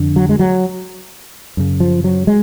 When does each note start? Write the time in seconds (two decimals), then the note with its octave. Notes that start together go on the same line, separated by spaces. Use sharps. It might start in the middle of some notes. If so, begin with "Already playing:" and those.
Already playing: F2 D3
0.16 F#3
0.29 G#3
0.39 F#3
1.57 F#2 C#3
1.80 F3
2.04 F#3
2.27 G#3